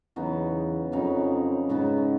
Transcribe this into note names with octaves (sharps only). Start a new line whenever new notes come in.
E2 C#3 F#3 B3 D#4
F2 C#3 F#3 B3 D#4
G#2 C#3 F#3 B3 D#4